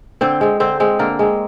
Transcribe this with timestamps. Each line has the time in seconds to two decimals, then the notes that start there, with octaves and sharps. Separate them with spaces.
0.21 D3 C4 C5
0.41 G#3 C4
0.60 D3 C4 C5
0.80 G#3 C4
0.99 D3 A#3 A#4
1.19 G#3 C4